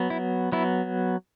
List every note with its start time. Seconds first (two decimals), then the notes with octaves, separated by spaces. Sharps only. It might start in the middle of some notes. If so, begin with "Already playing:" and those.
Already playing: F#3 B3
0.10 E4
0.52 F#3 B3 E4